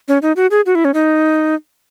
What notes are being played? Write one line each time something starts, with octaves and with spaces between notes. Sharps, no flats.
C#4
D#4
F#4
G#4
F#4
E4
C#4
D#4